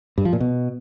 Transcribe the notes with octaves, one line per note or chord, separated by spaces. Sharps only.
G2
F3
A#2
B2